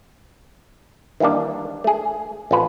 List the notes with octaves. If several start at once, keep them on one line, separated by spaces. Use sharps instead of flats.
D#3 E3 G3 A#3 D4
A3 G#4
A1 C4 F4 B4 A5